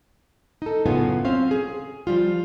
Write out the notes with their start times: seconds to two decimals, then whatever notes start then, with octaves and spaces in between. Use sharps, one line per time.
0.62 D#4 A4
0.86 F#2 A2 C#3 B3 F4 G#5
1.25 C4 C#4 C5 F5
1.51 G#4
2.07 F3 G3 F4